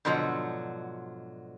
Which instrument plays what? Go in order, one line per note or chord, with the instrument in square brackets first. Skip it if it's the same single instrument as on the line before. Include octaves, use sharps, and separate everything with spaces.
[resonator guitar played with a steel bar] G#2 B2 D3 F3 F#3